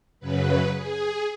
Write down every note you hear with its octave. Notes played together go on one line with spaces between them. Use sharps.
F#2 C#3 F#3 B4
G#4